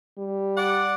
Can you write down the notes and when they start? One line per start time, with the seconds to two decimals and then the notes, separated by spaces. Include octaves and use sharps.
0.18 G3
0.58 D5 F#5